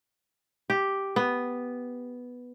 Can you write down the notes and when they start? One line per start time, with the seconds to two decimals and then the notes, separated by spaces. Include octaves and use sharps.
0.70 G4
1.16 B3